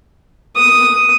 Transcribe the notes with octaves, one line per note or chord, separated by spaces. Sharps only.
D#6